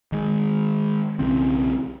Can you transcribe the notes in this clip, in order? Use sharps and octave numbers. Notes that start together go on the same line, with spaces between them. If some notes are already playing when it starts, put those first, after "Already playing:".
D#3 G#3
B1 C#3 E3 C4